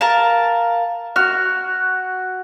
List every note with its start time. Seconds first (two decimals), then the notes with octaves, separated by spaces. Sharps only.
0.01 A#4 F5 A5
1.16 F#4 F6